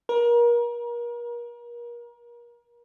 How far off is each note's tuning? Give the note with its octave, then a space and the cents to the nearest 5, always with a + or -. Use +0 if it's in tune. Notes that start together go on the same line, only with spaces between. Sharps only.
A#4 +30